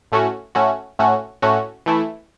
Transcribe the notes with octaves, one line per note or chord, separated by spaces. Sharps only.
A2 A3 C#4 F#4
A2 A3 C#4 F#4
A2 A3 C#4 F#4
A2 A3 C#4 F#4
E3 A3 E4